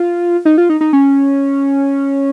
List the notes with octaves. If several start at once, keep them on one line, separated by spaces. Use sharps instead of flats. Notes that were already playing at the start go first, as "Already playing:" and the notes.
Already playing: F4
D#4
F4
D#4
D#4
C#4